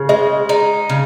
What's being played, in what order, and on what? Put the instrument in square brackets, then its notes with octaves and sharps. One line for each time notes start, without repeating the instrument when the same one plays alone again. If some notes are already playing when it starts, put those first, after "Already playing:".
Already playing: [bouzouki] C#3
[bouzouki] G#3 [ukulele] D#5
[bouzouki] D#4
C#3